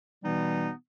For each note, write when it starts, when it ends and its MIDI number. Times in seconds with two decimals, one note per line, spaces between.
0.23 0.71 47
0.23 0.71 52
0.23 0.71 55
0.23 0.71 59
0.23 0.71 63